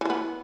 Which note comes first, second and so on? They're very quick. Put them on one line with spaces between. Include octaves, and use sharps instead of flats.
E3 F3 B3